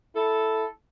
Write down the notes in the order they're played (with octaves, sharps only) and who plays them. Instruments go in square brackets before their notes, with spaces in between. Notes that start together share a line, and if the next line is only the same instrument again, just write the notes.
[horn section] E4 A4